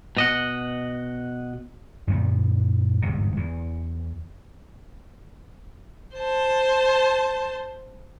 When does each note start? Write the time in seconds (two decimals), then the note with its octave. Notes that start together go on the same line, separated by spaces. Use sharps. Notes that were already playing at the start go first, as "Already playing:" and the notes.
0.17 B2 D#5 F#5
2.07 F#2 A#2 D3 B3
3.02 G1 E2 G#2 C3
3.37 E2 E3
6.16 C5 A5